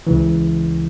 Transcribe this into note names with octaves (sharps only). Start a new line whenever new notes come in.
C#2 C#3 E3